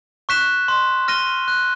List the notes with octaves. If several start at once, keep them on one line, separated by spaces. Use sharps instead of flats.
C#6 F#6 B6 E7
C6
F6 A#6 D#7 G7
F#6